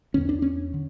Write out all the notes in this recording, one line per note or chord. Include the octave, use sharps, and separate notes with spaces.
E2 D3 C#4
D4
C#4
D3